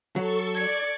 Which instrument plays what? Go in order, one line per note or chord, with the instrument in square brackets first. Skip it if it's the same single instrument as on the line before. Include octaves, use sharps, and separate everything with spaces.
[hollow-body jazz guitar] F#3 [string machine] A4 C#6
[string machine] D5 [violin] G#6 C#7